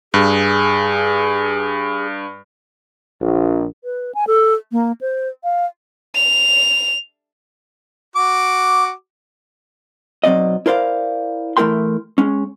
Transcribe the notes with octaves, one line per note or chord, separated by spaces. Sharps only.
G2 G#4
A#1
B4
G#5
A4
A#3
C5
F5
F7
F#4 D6
B1 F#3 C4 D5 D#5
E4 A#4 C5 D5 F5
E3 A3 E4 A#4 G5 C6
G#3 C#4